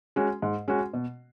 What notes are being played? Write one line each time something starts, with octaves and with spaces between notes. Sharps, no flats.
G#3 C#4 F#4
G#2
G#3 C#4 F#4
B2